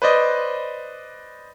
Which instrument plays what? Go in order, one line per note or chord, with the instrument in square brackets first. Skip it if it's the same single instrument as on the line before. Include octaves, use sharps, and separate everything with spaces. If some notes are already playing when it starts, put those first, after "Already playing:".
[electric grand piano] B4 C5 D5 D#5